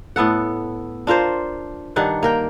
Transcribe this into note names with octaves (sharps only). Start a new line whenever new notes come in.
A2 B3 A4 F#5
D4 F4 A#4 C5
G2 D#3 D4 F#5
A#3 A#4 G5